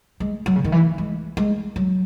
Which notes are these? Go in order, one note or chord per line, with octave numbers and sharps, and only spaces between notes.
G#3
F#3
C#3
D#3
E3
G#3
G#3
F#3